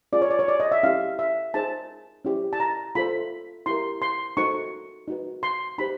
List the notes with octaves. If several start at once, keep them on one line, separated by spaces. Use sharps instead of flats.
C#4 F4 G#4 D5
C#5
D5
C#5
D5
D#5
E5
C#4 E4 G4 F5
E5
D#4 G#4 C5 A5
C#4 E4 G4 C5
A5
A#5
F4 A4 C5 B5
E4 G4 A#4 C6
C6
D#4 F#4 A4 C5 C#6
D#4 F#4 B4
C6
D#4 G4 C5 B5